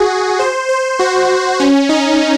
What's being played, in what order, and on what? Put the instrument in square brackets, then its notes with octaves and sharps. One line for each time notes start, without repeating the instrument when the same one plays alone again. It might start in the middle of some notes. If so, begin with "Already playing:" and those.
Already playing: [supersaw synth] F#4 G#4
C5
C5
F#4
C#4
D#4